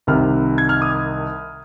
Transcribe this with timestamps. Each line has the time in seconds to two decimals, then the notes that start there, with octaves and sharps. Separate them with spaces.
0.07 C2 C3 D#3 F6
0.58 G#6
0.69 F6
0.82 D#6